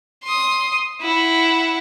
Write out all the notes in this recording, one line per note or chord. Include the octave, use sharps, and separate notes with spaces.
C6 D#6
E4 F#5